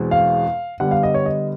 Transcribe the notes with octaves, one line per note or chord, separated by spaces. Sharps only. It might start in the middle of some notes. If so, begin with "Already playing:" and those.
Already playing: E2 B2 G#3 C4
F5
D3 G3 B3 F#5
F5
D#5
C#5
D#5